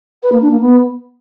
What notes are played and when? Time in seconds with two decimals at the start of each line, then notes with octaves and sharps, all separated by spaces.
0.22 B4
0.32 A#3
0.41 D4
0.51 A#3
0.60 B3